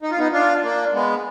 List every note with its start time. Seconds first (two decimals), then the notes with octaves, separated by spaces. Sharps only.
0.02 D#4
0.11 F4
0.18 B3 D#4
0.32 D4 F4
0.63 A#3 D4
0.93 G#3 B3